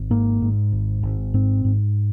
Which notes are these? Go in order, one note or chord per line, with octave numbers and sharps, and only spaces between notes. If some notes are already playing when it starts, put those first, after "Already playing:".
Already playing: G#1
G#2 A#3
G#2
G#1
G#1
G#2 C4
G#2